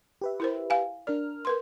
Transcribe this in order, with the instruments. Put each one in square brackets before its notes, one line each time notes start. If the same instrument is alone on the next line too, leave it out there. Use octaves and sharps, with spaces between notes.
[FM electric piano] G4 B4 E5
[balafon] E4 A#4 C5
F5 G#5
[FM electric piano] D4 A#4 F6 [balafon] D5
[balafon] A#4 B4 C6